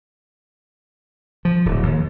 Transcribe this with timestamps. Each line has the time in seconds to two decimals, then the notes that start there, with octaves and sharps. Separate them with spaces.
1.45 F3
1.66 D1
1.83 D#2